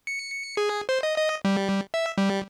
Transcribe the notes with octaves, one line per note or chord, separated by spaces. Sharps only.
C#7
G#4
C5
D#5
D#5
G3
E5
G3